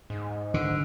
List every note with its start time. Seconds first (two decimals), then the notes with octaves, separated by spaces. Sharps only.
0.10 G#2
0.54 D3